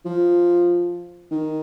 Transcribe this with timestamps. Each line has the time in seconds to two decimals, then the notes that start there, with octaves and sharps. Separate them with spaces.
0.05 F3
1.31 D#3